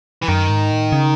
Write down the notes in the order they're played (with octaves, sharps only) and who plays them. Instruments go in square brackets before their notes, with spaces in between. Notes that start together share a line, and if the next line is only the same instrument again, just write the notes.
[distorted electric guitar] E3
[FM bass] F#2 [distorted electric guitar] D#3
[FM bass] G#2
A2
C#3